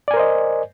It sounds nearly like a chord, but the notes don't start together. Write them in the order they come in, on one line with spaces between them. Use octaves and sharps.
D5 G#5 A#4 C5 D#5